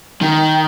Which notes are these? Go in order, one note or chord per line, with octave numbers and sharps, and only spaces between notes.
D#3